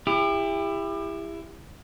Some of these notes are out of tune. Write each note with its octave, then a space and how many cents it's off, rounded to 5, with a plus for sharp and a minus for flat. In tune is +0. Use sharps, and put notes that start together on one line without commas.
E4 +15 G4 +35